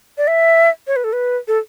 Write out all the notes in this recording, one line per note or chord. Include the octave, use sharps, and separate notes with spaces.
D5
E5
C#5
B4
A4
B4
A4